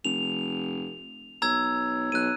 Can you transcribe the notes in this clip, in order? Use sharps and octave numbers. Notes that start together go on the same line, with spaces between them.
F1 F7
B1 A#5 E6 G#6
B1 F#6 D#7